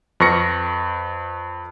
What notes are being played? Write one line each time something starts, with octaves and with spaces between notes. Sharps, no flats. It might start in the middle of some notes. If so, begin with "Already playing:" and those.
F2 B4 C#6 A#6 C#7